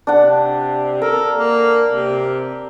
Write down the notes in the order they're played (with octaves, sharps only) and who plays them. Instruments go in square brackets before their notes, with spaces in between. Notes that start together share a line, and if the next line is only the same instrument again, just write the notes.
[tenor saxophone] C3 [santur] D4 F#5
[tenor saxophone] A4 [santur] A#4
[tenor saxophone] A#3
C3